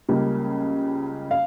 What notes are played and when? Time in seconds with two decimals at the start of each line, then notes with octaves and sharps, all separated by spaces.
0.09 C#2 C#3 G3 A#3
1.31 F5